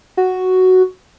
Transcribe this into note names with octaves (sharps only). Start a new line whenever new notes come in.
F#4